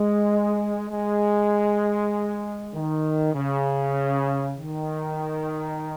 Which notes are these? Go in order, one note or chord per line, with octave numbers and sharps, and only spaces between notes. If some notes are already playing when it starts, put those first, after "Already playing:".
Already playing: G#3
G#3
D#3
C#3
D#3